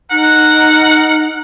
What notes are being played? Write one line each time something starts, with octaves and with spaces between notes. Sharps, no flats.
D#4 A#4 F#5